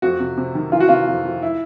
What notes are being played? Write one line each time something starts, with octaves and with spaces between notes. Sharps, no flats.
F2 F#4
C3
C3
D#3
E3 F4
F#4
C3 F4
F2
F2
E4